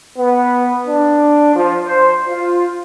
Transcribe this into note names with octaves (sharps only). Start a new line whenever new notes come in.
B3
D4
F3
C5
F4